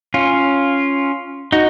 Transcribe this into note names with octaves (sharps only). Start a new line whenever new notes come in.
C#4 F4
D#4 F#4